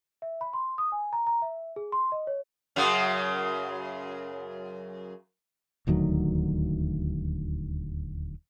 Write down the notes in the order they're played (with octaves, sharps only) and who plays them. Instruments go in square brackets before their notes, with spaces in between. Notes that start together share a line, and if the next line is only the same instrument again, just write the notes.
[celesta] E5
B5
C6
D#6
G#5
A#5
A#5
E5
G#4
C6
D#5
C#5
[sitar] F#2 C#3 F#3
[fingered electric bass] D#1 D2 D#3 F#3